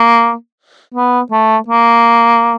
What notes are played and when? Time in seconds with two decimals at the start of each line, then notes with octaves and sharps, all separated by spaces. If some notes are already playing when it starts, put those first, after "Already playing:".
Already playing: A#3
0.94 B3
1.31 A3
1.68 A#3